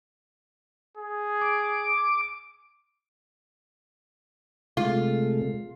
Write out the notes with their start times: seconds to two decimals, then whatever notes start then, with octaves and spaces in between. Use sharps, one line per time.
0.97 G#4
1.41 D6
4.77 C3 G#3 A3 F4